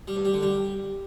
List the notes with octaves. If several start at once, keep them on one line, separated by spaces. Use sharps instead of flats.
G3
G2
G3
D3
G3